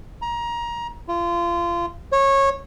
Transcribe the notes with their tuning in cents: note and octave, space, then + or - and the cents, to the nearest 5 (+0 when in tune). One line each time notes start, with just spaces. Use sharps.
A#5 +20
F4 -25
C#5 -20